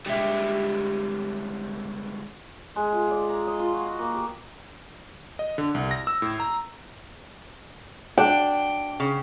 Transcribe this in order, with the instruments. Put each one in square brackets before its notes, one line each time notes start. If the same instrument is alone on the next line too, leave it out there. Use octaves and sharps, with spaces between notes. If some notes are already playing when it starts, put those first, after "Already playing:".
[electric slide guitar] D3 G3 G#3 [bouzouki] E4 G4
[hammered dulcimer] G#3
F4
D5
A#5
D#5
F4
F#4
F#4
A#3
G4
[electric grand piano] D#5
D3
C2
A#6
E6
A2
A#5
[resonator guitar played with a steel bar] D4 [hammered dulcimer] G5
[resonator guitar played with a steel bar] C#3